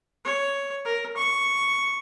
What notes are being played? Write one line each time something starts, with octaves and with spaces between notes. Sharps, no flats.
C#5
A#4
C#6